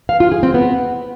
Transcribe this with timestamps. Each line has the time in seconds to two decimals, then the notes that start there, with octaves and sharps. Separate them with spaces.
0.09 F5
0.20 F4
0.32 G#4
0.43 C4
0.54 B3